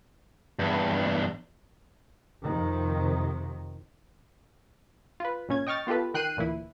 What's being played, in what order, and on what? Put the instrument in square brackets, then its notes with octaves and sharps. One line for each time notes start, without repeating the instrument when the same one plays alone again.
[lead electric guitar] E2 G2
[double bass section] F2 C3 D#3
[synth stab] F4 B4
G#1 A#2 C#4 G#6
D#5 G5 C#6 F6 A6
B3 F4 G4 A4 B4
D#3 G5 F#6 C7 D#7
D2 A#2 E3 E4